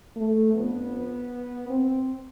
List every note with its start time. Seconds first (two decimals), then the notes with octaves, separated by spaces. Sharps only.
0.17 A3
0.54 F2 D3 F3 B3
1.70 C4